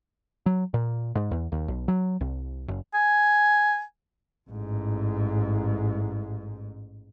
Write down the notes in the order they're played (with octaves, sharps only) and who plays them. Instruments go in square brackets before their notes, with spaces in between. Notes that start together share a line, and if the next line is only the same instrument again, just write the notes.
[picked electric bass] F#3
A#2
G#2
E2
D#2
B1
F#3
C2
F#1
[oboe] G#5
[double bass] A1 G#2